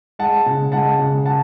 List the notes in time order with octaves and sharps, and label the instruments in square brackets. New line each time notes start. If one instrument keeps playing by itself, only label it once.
[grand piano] G#3 F#5 A5
C#3
G#3 F#5 A5
C#3
F#5 A5